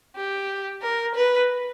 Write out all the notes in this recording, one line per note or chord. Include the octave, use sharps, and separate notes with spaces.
G4
A#4
B4